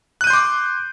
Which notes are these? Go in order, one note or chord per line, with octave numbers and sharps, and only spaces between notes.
C6 D6 F#6 G6 D#7